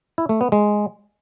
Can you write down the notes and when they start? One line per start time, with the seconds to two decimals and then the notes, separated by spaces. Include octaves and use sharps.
0.18 E4
0.29 A3
0.41 B3
0.52 G#3